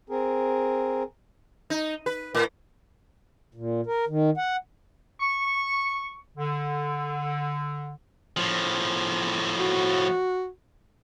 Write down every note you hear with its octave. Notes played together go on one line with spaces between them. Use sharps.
C4 G#4 A#4
D#4
B4
A2
A#2
A#4
D#3
F#5
C#6
D3
A2 F3
F#4